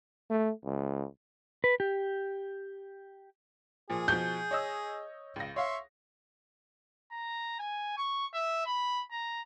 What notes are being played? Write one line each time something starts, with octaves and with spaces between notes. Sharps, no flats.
A3
C#2
B4
G4
A#2 F3 G#4
B2 F3 G6
C#5 D#5 E6
C#2 A#6
C#5 E5 F5 C6 C#6
A#5
G#5
C#6
E5
B5
A#5